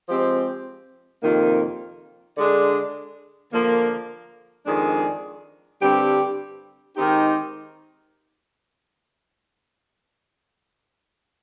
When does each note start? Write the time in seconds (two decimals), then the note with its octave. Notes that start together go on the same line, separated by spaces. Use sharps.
0.07 F3 G#3 C4 G4
1.21 F2 C3 D#3 A#3 F4
2.36 D3 G#3 D4
3.52 D3 F3 A#3
4.66 F2 D#3 G#3 D4 G#4
5.80 G2 D3 G3 C4 G4
6.95 D#3 G#3 C4 D#4 G4